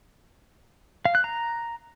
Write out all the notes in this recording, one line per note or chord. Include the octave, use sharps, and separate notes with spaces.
F5
F#6
A#5